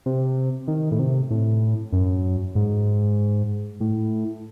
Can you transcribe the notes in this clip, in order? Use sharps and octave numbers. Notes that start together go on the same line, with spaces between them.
C3
D#3
A2
C3
A2
F#2
G#2
A2